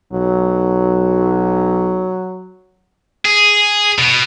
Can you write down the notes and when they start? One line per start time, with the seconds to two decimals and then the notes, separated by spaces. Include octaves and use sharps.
0.13 B1 F#3
3.25 G#4
3.99 B2